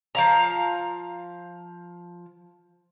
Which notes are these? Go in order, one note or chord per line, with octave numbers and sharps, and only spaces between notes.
F3 F5 A#5